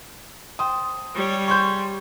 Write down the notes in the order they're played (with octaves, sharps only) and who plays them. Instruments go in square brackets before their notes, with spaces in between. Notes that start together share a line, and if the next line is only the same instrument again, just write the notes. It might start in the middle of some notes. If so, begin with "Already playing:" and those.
[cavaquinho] C5 G5 A5 [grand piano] D#6
[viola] G3 C#5
[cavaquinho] G#4 C5 C6 [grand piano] C#6 G6